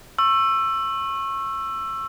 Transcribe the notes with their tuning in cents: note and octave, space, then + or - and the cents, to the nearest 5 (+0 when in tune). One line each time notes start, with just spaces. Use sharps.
C#6 -25 E6 +15